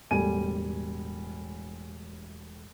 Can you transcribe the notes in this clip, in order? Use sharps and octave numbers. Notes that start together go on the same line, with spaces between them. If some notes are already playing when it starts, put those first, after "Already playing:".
E1 A2 G3 G#5 D#7